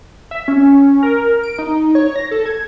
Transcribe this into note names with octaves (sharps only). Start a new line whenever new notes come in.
E5
C#4
A#4
D7
D#4
C#5
A#6
A4
G#6